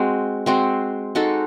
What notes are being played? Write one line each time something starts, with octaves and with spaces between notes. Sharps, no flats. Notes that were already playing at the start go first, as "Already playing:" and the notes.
Already playing: G#3 C4 F#4
G#3 C4 F#4
G#3 D#4 F#4 A4